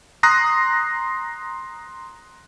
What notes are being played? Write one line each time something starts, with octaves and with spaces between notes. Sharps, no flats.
A#5 C6 D#6 F#6 A#6 C7